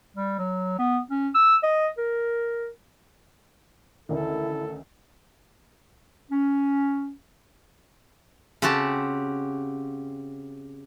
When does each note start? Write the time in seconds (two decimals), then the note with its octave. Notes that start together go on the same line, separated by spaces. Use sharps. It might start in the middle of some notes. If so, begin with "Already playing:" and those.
0.16 G3
0.38 F#3
0.79 B3
1.10 C#4
1.34 E6
1.63 D#5
1.98 A#4
4.09 A1 D2 D#3 E4 A4
6.30 C#4
8.62 C#3 C4 F#4 G4 A5